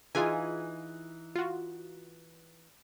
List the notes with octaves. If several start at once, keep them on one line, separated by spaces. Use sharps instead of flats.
E3 D#4 F4 G#4 G#5
F4 F#4